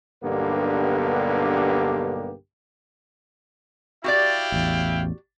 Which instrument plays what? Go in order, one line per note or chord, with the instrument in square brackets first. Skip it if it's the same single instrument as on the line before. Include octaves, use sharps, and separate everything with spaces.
[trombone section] B1 G2 D3 A#3 B3 G4
[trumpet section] E4 F5 G5 [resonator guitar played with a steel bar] F#4 G4 D5
[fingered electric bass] A1 E2